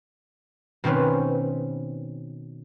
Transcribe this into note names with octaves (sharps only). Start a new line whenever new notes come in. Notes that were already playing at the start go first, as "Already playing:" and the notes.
B2 D#3 C4 C#4 B4